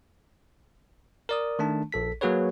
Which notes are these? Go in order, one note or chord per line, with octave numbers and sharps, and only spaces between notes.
A#4 D5 D#6
D#3 A3 D4 A5
A#1 A4 B6
F#3 A#3 F#4 G#4 B4 C#5